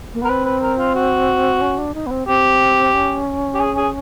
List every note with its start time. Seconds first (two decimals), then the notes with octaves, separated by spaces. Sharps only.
0.14 A#3
0.22 B3
0.25 A#4
0.29 C4 B4
0.45 B4
0.62 A#4
0.79 F4
0.95 F#4
1.61 C#4
1.78 D4
1.94 D#4
2.06 B3
2.11 C4
2.28 C4 G4
2.94 C#4
3.54 G4
3.60 G#4
3.77 G#4